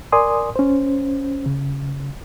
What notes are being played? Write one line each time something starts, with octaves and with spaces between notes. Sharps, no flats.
A#4 D5 G#5 C6 D#6
C#4 C5
C#3